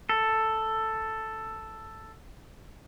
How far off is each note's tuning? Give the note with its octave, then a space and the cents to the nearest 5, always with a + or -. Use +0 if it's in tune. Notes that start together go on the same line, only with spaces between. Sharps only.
A4 +5